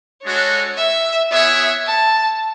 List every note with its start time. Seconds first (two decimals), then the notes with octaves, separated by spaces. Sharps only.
0.23 G#3 D4 F#4 A4 C#5
0.77 E5
1.31 B3 E4 G#4 C#5 E5
1.87 A5